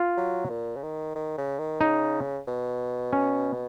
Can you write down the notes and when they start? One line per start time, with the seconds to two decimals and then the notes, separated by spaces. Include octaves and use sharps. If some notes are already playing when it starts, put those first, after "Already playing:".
Already playing: F4
0.18 F#3
0.50 A#2
0.76 C#3
0.83 D#3
1.16 D#3
1.38 C#3
1.59 D#3
1.81 C#3 D#4
2.47 B2
3.13 C#4